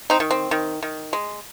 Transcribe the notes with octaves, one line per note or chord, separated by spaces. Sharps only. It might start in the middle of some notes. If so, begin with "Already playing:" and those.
C4 D#4
D#3
C4
D#3
D#3
G#3